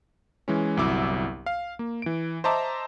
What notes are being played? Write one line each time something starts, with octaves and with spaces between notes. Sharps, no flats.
E3 G#3 C#4
G1 C2 F#3 E4 D6 E6
F5
A#3
E3 D7
C5 D#5 E5 A5 A#5 D6